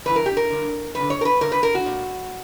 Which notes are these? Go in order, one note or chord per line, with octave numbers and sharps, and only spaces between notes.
G2 E3 B4
A#4
G4
A#4
G2 D3
F#2 D3 B4
C#5
A#4
B4
G2 D3 A#4
B4
A#4
F#4
A#2